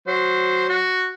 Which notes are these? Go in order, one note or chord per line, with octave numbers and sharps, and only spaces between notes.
F#3 C5
F#4